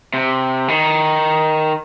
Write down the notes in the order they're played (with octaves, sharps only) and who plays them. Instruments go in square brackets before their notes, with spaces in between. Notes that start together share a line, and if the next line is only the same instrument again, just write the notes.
[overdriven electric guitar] C3
D#3